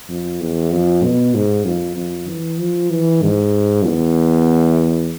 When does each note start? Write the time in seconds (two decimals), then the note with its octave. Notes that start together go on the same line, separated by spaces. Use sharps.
0.09 F2
0.40 E2
0.72 F2
1.03 B2
1.34 G#2
1.65 F2
1.97 F2
2.28 E3
2.59 F3
2.90 E3
3.22 G#2
3.85 E2